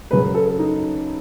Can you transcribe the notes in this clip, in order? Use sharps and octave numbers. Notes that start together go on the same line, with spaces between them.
F#2 C#3 F#3 B4
B4
A4
A4
D#4